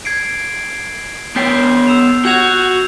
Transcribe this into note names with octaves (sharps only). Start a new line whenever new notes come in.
G#6 C7 D7
B3 C#5 G5 G6 B6 C7
E6 E7 F7
F#4 F#5 G6 G#6 F7